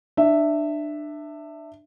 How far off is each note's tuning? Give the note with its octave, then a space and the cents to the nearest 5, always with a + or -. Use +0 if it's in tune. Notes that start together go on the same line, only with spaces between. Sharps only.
D4 +25 E5 +0